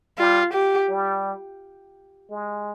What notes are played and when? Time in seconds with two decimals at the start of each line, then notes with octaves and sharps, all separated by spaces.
0.18 G3 F4
0.53 G4
0.90 G3
2.30 G#3